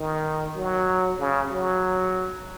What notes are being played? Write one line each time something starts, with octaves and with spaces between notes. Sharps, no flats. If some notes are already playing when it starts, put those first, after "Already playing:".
Already playing: D#3
F#3
C#3
F#3